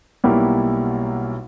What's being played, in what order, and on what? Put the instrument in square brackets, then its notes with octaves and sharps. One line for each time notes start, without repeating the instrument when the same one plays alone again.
[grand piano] B1 B2 G3 A#3 E4